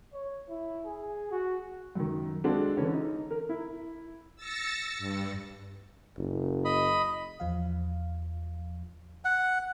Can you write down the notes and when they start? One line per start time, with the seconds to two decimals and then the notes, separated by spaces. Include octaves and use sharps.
0.14 C#5
0.50 E4
0.86 G#4
1.31 F#4
1.95 F#2 D#3
2.44 G#3 C4 D4 F4 F#4 A4
2.77 D3 E3 C#4
2.93 D#4
3.30 A#4
3.49 E4
4.36 E6 A6 A#6 C#7
4.98 G2
6.18 F#1
6.65 D#5 B5
7.40 E2 F3 F5
9.25 F#5